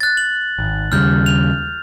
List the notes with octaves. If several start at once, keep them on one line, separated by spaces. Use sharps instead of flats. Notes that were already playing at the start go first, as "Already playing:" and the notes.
F#6 A6
F#7
G#1
D#2 C#3 G3 F6 G6
F7